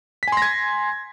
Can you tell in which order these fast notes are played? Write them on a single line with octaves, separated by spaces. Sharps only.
B6 G#5 C6 A#6 G#6